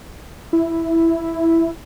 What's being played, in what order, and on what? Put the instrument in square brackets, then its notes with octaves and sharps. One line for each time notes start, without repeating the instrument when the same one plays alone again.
[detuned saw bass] E4